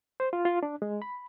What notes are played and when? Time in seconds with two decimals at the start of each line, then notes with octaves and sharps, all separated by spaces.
0.20 C5
0.33 F4
0.45 F4
0.63 D4
0.82 G#3
1.02 B5